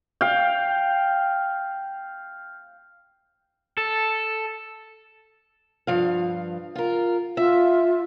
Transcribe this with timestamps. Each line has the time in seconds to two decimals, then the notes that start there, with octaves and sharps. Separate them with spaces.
0.21 F5 G5
3.78 A4
5.87 G2 F3 F5
6.76 F4 A#4
7.37 F4 E5